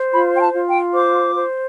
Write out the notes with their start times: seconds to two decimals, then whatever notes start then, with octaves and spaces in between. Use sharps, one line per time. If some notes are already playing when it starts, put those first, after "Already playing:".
Already playing: C5
0.13 F4 B5
0.35 G5
0.40 A5
0.53 F4
0.68 G5
0.95 C5 D6
1.36 C5